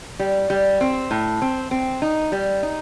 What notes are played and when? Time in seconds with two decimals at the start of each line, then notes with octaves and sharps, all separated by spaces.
0.19 G3
0.50 G3
0.81 C4
1.11 A2
1.42 C4
1.71 C4
2.02 D#4
2.32 G3
2.63 D#4